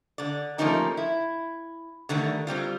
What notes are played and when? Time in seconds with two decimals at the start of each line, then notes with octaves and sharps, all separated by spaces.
0.18 D3 D5
0.58 F3 A3 A#3 C#4 D#4 G4
0.97 E4
2.09 D3 D#3 G3 A3
2.47 F#3 G3 C4 F4